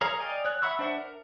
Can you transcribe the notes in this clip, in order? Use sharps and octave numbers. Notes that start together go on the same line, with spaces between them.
G#4 A#4 C#5 F5 A#5
D5 D#5 F5 G5 G#5
C#5 F#6
E5 F#5 B5 C#6 E6
D4 C5 E5 F#5
A#4